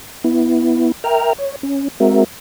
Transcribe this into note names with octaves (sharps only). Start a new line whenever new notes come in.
B3 E4
A#4 E5 G5 A#5 F6
C#5
C#4
G#3 C4 F#4 A#4 E5